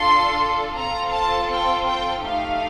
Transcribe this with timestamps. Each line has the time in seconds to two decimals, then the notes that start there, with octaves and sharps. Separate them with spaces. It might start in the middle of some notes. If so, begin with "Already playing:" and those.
Already playing: D4 F4 A4 C6
0.75 C4 F4 A4 A#5
1.12 A5
1.50 G5
1.86 G5
2.23 A3 D#4 G4 F5